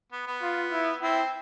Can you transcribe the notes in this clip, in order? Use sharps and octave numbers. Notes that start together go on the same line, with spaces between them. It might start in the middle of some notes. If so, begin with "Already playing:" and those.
B3
B3
F4
E4
C4 E4